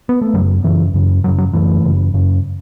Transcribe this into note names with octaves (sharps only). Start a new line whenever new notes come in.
B3
A3
F#2 C#3 F#3
F#2 C#3 E3
F#2 C#3
F#2 C#3 F#3
F#3
F#2 C#3 E3 A3
F#2 C#3
F#2 C#3